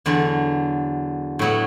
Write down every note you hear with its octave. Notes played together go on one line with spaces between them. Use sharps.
E2 D3 F#3
A2 F#3 B3 E4